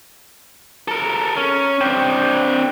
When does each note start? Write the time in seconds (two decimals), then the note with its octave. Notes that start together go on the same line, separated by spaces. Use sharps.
0.88 A4 A#4
1.37 C#4
1.81 C4 D4 G5